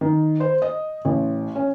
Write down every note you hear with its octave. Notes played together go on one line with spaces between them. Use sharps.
D#3
C5
D#5
A1
C#4